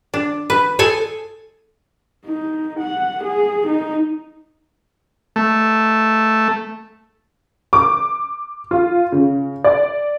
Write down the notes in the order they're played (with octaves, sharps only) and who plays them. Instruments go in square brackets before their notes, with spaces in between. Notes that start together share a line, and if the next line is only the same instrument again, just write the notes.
[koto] D4
B4
G#4 A4 G#5
[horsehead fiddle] D#4
F#5
G#4
D#4
[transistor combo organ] A3
[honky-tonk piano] D6
F4
C#3
D5